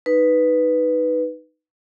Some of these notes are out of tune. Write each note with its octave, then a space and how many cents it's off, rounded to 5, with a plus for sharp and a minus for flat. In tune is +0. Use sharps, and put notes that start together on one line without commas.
D#4 +0 B4 +0